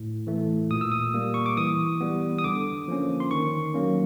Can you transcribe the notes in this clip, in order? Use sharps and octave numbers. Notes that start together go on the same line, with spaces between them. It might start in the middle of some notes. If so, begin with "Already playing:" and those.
Already playing: A2
E3 A3
A#2 D#6
E6
D#6
G3 A#3
C#6
D6
E3 D#6
G3 B3
D#6
D3 D6
F3 A#3 C#4
C6
D#3 C#6
F#3 A#3 C#4